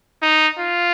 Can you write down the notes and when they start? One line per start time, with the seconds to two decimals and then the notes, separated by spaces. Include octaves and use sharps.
0.22 D#4
0.59 F4